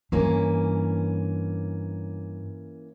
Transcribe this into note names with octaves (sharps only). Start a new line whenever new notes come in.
G2 E3 A#3 C#4